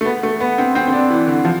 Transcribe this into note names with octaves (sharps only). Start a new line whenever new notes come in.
A3
B3
A3
B3
C4
C4
C4
D4
E3
D3
F3